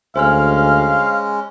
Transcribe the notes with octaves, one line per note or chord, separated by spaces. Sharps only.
D2 G#3 C#4 C5 F5 G#5 F6